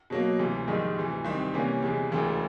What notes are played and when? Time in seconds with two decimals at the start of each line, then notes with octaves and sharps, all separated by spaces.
0.10 B2 F#3 A#3
0.39 D2 C3 E3
0.67 A#1 G#2 D#3 G3
0.96 D2 C3 E3
1.25 C2 C3 D#3 G3 C4
1.54 C3 E3 G3 A#3 C#4
1.83 E2 C3 E3 G#3
2.11 E1 D2 C#3 E3